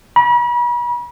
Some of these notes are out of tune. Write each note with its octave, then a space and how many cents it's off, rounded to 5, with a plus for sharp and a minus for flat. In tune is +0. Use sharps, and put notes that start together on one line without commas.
B5 -40